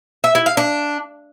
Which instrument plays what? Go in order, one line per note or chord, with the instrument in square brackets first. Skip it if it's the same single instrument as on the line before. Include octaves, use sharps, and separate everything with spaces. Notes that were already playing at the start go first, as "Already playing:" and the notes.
[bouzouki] E5
E4
F5
D4